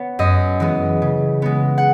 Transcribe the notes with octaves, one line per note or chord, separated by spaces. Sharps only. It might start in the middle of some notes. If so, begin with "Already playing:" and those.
Already playing: B3 C#5
F#2 D#5
E3 G#3 B3
C#3
G#3 B3
F#5